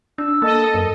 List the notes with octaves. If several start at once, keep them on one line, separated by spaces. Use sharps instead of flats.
D4 E6
A#3 A4 D#5 A5
F#2 A#4